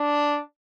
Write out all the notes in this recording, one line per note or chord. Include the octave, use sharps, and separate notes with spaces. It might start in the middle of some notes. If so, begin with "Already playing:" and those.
Already playing: D4